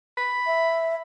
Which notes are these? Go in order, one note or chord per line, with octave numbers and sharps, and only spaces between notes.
B5
E5